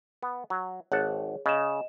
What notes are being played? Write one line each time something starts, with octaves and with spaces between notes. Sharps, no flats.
B3
F#3
G#1 G#4 C#5 F#5 A5
C#3 D#5 E7